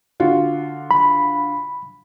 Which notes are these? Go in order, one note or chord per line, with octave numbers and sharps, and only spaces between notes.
D3 F4 F#4
B5